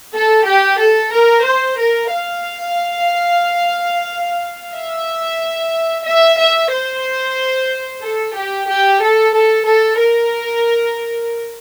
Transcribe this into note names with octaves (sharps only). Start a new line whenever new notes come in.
A4
G4
A4
A#4
C5
A#4
F5
E5
E5
E5
C5
A4
G4
G4
A4
A4
A4
A#4